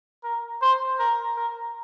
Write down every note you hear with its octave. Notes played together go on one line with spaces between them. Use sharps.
A#4
C5
A#4
A#4